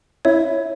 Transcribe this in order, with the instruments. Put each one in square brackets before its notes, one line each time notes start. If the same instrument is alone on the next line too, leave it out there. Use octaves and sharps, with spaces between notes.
[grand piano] E4 [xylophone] C#5